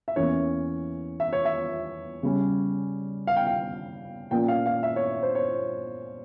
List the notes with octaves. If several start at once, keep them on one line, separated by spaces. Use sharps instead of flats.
E5
E2 E3 A#3 C#4 C#5
E5
C#5
E5
C#3 G3 C#4
F5
G5
F5
A#2 F3 A#3 C#4 G5
F5
F5
E5
C#5
C5
C#5